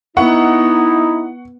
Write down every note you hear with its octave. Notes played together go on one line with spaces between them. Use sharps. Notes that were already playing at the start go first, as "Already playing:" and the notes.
B3 D#4 E4 F#5 C#6